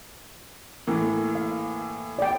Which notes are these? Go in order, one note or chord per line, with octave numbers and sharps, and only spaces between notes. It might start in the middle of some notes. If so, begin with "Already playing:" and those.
A2 E3 A#3
F5
D5 G5